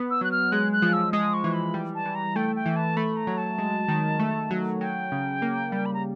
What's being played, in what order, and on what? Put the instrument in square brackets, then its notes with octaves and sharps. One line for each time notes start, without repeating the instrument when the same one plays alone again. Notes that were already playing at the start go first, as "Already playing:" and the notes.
Already playing: [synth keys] B3
[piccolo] E6
[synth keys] F#3 [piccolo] F#6
[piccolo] F6
[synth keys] G#3 [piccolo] F#6
[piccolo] F#6
[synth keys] F3
[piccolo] E6
[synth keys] G#3 [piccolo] D#6
[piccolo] C#6
[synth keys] E3
[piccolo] B5
[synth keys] G3
[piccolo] A5
[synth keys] E3
[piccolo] A#5
[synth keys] A3 [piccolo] G5
[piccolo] G5
[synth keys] E3
[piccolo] A5
[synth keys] A3 [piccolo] B5
[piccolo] A#5
[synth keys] F#3
[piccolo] A5
[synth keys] G#3
D#3
A3
F#3
[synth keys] F#3 [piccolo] G5
[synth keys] C#3
A#3
G3
[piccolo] B5
A#5